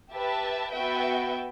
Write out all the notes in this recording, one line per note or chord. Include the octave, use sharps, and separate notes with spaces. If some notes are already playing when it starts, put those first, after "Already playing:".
G4 B4 E5 A5
B3 F#4 B4 E5 G5